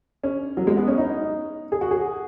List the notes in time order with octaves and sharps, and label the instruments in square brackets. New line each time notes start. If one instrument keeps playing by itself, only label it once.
[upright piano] C#4
F#3
G#3
B3
C#4
D#4
G#4
F#4
G#4